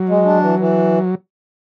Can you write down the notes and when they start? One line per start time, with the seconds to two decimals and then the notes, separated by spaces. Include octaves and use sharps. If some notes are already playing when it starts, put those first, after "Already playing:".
Already playing: F#3
0.09 G#3
0.25 D4
0.42 E3
0.59 E3